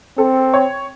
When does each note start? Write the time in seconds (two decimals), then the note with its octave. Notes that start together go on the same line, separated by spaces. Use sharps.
0.18 C4 A4
0.54 C#5